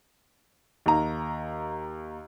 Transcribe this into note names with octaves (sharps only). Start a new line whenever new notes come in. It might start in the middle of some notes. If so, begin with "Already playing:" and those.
D#2 A#5